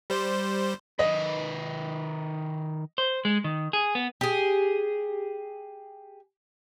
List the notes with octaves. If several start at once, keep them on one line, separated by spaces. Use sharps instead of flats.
G3 C5
D#3 B4 D#5
C5
G#3
D#3
G#4
B3
G4 G#4